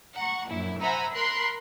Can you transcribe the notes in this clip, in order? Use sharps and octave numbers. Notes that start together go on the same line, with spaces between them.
F#5 A#5 C#6
A#1 F#2 E4
C5 E5 F#5 G#5 A#5 B5
A#4 B5 C6 F#6 C7